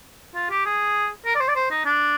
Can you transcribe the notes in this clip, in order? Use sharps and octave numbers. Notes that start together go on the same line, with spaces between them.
F4
G4
G#4
A#4
D5
C5
D5
C5
D#4
D4